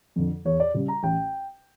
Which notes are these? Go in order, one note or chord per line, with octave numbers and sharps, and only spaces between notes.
F2 D3
E2 C#5
D5
C#3 G3
A#5
A1 G5